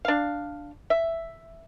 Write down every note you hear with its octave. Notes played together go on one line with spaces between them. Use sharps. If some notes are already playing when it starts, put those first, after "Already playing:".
D4 F5
E5